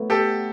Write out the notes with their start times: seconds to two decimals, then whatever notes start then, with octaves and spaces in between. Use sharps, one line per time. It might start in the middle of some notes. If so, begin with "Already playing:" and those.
Already playing: A2 F#3 B3 E4
0.10 G4 A4